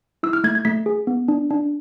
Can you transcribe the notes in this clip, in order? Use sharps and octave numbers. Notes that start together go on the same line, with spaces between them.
E4 E6
F6
A3 G#6
G#6
A3 B6
G#4
B3
D4
D4